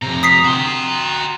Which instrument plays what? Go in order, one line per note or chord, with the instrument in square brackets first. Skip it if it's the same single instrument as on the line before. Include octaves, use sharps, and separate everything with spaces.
[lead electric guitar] F2 C3 [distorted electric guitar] A#5
[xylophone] D#6 B6 C7
[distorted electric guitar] F#4 C6 [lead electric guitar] G5 A#5